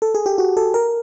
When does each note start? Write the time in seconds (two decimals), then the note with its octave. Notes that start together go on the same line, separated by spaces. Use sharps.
0.02 A4
0.15 G#4
0.26 G4
0.38 F#4
0.57 A4
0.74 A#4